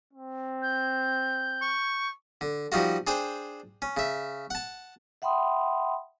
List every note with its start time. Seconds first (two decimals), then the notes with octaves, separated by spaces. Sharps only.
0.14 C4
0.62 G6
1.62 C#6
2.41 D3
2.72 F3 G3 D#4 F4 F#4
3.07 D4 G#4 C5 G5 G#5
3.82 C#4
3.97 C#3 E5
4.50 F#5 A5
5.22 E5 F#5 G5 B5 C6 D#6